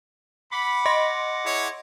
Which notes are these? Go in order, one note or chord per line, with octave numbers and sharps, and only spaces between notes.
F#5 B5 D6
D#5 C6 A#6
E4 G#4 C#5